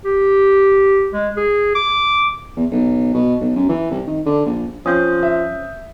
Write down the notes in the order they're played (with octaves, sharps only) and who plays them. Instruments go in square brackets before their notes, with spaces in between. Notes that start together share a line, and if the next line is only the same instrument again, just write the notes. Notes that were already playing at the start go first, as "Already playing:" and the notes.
[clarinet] G4
G#3
G#4
D6
[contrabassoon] E2
B1
B2
B1
F#2
E3
C2
D#3
D3
A#1
[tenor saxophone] F3 [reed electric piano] C4 C#4 [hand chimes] D#6 G6
[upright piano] E5